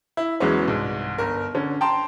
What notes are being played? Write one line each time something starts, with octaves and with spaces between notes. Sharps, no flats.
E4
E2 E3 F#3 G#3 B3 C#4
C2 G#2
G1 A#4
D3 C#4
G5 A5 A#5 C6